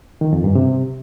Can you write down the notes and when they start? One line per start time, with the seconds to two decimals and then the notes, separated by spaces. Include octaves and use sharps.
0.21 D#3
0.33 F2
0.44 G2
0.55 C3